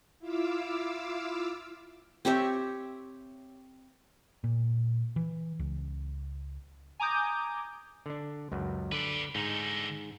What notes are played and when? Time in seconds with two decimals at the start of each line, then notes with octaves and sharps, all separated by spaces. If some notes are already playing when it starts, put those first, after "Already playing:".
0.19 E4 F4 F5 D6 E6
2.25 C4 G4 C#5 E5
4.44 A#2
5.16 E3
5.59 C#2
7.00 G#5 A#5 D6 D#6 G6
8.06 D3 D4
8.52 C#2 F#2
8.92 D3 B4 D5
9.35 G#2 D3 D#4